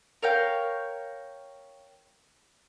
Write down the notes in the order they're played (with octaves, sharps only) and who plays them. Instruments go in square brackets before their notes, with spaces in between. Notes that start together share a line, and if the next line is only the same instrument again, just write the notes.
[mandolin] A#4 C#5 F5 G5